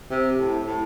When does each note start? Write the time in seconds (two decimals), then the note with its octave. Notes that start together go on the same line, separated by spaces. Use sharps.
0.10 C3
0.39 A2
0.67 A2